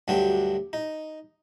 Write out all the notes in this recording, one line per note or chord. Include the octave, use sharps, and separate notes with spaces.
D2 G2 F#3 D4 G4
D#4